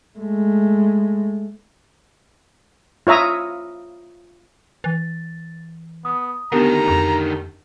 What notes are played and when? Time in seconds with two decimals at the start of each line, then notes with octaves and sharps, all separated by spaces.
0.19 G#3 A3
3.07 F4 C#5 E5 A#5 D#6
4.84 E3 A6
6.05 B3 D#6
6.52 D2 D#3 B3 D4 G4 A#4 A#5
6.88 F2